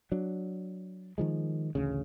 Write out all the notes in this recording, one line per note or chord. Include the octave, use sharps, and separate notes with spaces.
F#3 D4
D#3 F3 G#3
A1 D2 C#3